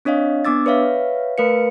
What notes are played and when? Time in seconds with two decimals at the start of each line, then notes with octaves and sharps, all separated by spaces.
0.05 C4 D4 C#5 D#5 F5
0.45 B3 D4 D6 E6 A6
0.66 B4 C#5 E5 F5
1.38 A3 A#4 B4 F5 C#7